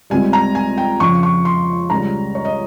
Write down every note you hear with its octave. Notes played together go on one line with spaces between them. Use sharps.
C#2 C3 G3 G#5
A#5
G#5
G5
F2 C#3 F3 C#6
C#6
C6
C#2 C#3 G3 A#5
C#5
D#5